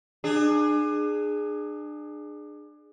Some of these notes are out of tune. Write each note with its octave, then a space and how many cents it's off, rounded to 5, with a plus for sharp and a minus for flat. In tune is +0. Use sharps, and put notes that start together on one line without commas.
D4 +30 G#4 +0